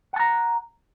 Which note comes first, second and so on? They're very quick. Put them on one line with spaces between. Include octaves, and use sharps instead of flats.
F#5 A5 A#5